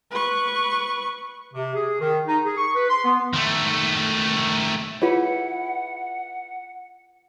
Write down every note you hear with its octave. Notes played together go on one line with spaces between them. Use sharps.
B4 C#6
C3
G#4
D#3
D#4
G#4
C#6
B4
C6
B3
D#3 A3
E4 F4 G#4 B4 C#5 F#5